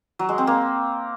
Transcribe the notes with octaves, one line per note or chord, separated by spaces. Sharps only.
F#3
G#3
C4
A#3